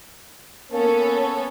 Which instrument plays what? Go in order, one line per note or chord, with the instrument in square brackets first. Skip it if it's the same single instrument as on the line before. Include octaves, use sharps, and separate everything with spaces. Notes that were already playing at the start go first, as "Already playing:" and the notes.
[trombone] A#3 [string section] B3 C#4 A4